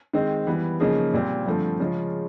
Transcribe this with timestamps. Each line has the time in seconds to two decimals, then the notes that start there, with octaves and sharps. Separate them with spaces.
0.13 D#3 G#3 C4
0.47 E3 G3 B3
0.80 C#3 F3 A#3 D#4 G#4
1.14 A#2 G3 C4
1.46 G2 D3 F3 A3 C4
1.80 C#3 F3 G#3 C#4 F4